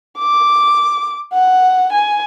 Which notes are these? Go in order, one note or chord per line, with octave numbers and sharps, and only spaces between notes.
D6
F#5
G#5